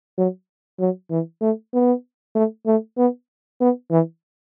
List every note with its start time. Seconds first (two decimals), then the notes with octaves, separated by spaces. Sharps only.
0.17 F#3
0.79 F#3
1.11 E3
1.41 A3
1.74 B3
2.35 A3
2.66 A3
2.97 B3
3.61 B3
3.91 E3